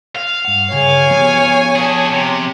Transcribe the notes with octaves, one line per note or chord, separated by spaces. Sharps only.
F5
G2 F#5
C#3 G#4 C#5 G#5
F3 B3 G4
D4 G#4
C3